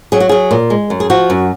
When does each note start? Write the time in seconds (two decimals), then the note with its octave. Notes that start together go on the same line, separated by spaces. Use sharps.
0.12 F#3 G#4
0.20 F#4
0.29 F#3 G#4
0.51 A#2
0.70 G#3
0.90 F#2
1.00 G#4
1.10 F3 F#4
1.30 F#2